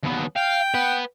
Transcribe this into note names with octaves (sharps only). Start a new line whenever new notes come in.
D#2 B3
F5 G5
B4 F#5